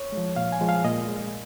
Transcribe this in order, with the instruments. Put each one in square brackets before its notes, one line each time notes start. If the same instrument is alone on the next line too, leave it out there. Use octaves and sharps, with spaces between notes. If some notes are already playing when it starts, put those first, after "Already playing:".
Already playing: [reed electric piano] C#5
G#3
F3
A#2 F5
G#5
F3 G#3
F5
A#2 D#5
G#3